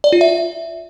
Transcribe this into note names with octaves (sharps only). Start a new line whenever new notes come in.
D5
F4
E5